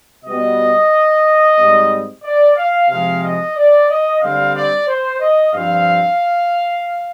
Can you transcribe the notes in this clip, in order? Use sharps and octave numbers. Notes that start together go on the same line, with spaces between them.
B2 G3 B3 D#5
G#2 G3 C4
D5
F5
C3 F3 G#3 C4 F5
D#5
D5
D#5
D3 G3 C4 F5
D5
C5
D#5
G2 F3 C4 F5